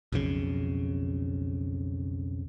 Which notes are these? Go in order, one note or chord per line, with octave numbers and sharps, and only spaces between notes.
B1 F2 C#3